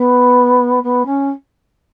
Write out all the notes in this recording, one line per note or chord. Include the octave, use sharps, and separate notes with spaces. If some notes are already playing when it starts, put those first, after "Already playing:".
Already playing: B3
B3
C#4